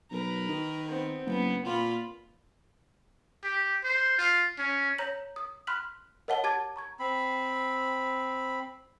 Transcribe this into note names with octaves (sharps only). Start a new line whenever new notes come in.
B1 A#4 B4
D#3
B3 C4
F#1 B3
A#2 F4 B5
G4
C5
F4
C#4
C#5 A#5 G6 A#6 B6 F#7
D#6
B5 C6 F6 F#6 B6 F#7
A#4 C#5 D#5 F#5 A5 G7
G4 A5 D6 G#6 A6
A#5 C#6 G#6
C4 B5